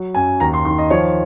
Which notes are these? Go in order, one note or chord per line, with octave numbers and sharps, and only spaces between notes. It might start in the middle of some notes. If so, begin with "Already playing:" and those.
Already playing: F#3
F#2 G#5
D#2 A#5
C6
D#3 C6
D#5
F3 C#5